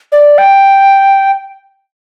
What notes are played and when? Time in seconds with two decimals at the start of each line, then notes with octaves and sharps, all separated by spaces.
0.12 D5
0.38 G5